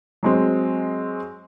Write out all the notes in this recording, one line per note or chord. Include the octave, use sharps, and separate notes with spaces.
F#3 G#3 C4